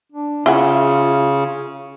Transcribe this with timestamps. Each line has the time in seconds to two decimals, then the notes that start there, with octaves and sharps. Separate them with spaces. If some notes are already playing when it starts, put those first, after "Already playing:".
0.12 D4
0.46 C#3 E4 F4 G#4 F#5